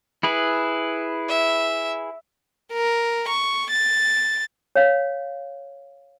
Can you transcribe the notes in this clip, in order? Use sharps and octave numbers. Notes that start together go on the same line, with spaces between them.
E4 G#4 B4
E5
A#4
C#6
A6
C#5 F5